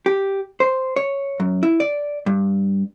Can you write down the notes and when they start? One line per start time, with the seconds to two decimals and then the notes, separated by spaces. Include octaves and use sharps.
0.06 G4
0.60 C5
0.96 C#5
1.40 F#2
1.63 E4
1.80 D5
2.26 G2